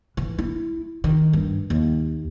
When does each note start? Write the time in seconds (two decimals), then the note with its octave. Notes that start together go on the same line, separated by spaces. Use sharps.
0.17 E3
0.38 E4
1.04 D#3
1.33 G2
1.70 D#2